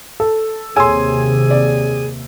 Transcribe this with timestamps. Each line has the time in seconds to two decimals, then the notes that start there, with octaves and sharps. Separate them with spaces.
0.20 A4
0.76 D#2 C3 G#4 C#5 G#5 C6 E6
1.50 D5